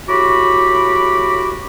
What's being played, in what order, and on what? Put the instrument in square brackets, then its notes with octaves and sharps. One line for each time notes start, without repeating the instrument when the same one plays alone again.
[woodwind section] A2 F#4 G4 B5 D6